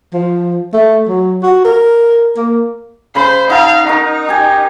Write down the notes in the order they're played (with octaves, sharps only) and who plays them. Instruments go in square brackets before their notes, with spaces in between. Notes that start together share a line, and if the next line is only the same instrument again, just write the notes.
[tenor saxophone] F3
A3
F#3
F#4
A#4
A#3
[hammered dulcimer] C#3 B5 [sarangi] C5
[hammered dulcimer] D#4 F#5 A5 [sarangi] F5
[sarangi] D#4 [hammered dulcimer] A#4 C#6
[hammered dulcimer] G4 G#5